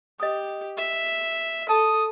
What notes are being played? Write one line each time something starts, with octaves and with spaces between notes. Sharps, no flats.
G4 D#5 D#6
E5
A4 A5 D#6